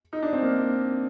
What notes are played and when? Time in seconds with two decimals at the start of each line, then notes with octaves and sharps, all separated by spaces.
0.13 D#4
0.22 D4
0.33 C4
0.43 A#3